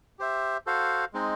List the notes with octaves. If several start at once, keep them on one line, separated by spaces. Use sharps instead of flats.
G4 C5 E5
F#4 A4 C5 F5
G#3 C4 D#4